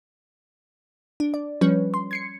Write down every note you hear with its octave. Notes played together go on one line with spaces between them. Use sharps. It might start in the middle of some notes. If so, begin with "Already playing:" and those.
D4
D5
F3 G3 C#4 B4 C#5
C6
G#6 C7 C#7